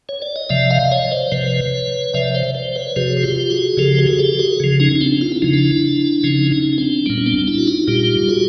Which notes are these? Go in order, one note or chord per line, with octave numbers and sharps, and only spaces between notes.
C#5
D5
D#5
C3 F3 D5 E5
D#5 F5
C#5 D#5
C5 D5
C3 F3 B4 C#5
C3 F3 D5 E5
C5 D5
C5 D5
B4 C#5
C3 F3 F#4 G#4
G#4
F4 G4
F#4 G#4
C#3 F3 G4 A4
F#4 G#4
G4 A4
F#4 G#4
C#3 F3
C#4 D#4
D#4
C4 D4
F4
E4
C#3 F3 D#4
D4 E4
C#3 F3 C#4 D#4
C#4 D#4
D#4
C4 D4
A#2 G3 B3 C#4
C#4
C4 D4
D4 E4
F#4
D#4 F4
A#2 G3 F4 G4
F#4 G#4